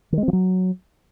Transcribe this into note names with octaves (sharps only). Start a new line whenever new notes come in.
D#3
G#3
C4
F3
F#3